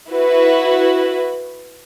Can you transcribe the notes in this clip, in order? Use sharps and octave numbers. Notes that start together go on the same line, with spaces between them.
E4 F#4 B4